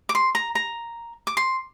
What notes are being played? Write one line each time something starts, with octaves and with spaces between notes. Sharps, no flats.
D6
C6
A#5
A#5
D6
C6